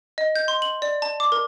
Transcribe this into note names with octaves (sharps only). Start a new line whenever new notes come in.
D#5
G6
C6
F#7
D5
A5
D6
A#4